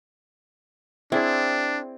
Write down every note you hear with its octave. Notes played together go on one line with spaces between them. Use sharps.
C4 D4 E4 G#4 D5